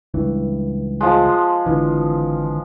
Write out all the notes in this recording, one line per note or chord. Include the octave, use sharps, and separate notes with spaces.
C#2 G2 E3
F3 G#3
G#1 D3 E3